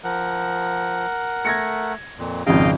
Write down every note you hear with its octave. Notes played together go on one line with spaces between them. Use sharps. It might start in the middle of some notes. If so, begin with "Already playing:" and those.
F3 A#4 F#5
A3 G#6 A#6 C#7
F2 A#2
G#1 F2 C#3 D#5 F5 G5